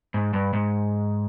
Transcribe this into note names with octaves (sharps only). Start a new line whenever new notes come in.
G#2
G2
G#2